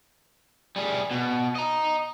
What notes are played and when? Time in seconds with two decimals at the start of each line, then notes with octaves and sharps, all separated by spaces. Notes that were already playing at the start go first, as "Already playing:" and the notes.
0.76 G3 G#4
1.11 B2
1.55 D#5 A#5